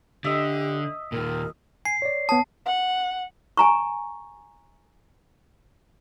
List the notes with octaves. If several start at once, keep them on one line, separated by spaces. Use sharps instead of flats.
D3 G4 D#5 E5
D#2 A#2 A#4
G#5 C7
C#5 D5
B3 C#5 A5 D#6
F#5
G#5 A#5 C#6